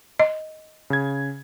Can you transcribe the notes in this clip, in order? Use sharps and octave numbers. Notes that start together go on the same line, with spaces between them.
D#5
C#3 G#6